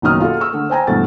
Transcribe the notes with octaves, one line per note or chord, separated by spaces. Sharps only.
F#1 B2 D#3 F#3 D#6 F6
F4 F#4 G#4 A4
C#6 E6
D3 A3
C5 G5 G#5 A#5
G2 B2 E3 A3 A6